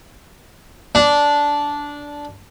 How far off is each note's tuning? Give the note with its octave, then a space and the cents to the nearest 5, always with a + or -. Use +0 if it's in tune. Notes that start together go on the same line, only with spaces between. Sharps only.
D4 -10